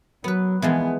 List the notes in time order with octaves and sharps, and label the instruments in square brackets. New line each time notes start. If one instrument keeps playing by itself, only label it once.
[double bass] F#3 [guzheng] B3 B4
[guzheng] E3 F3 G#3 [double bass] B3